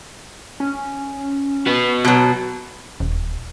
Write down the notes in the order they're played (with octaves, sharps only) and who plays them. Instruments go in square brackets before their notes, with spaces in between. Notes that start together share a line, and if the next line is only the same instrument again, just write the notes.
[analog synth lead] C#4
[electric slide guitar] F#4 B4
[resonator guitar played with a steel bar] B2 F#3
[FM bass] D#1